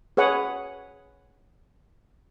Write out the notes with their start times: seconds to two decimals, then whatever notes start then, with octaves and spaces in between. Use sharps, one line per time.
0.17 G#4 B4 C#5 F#5 G#5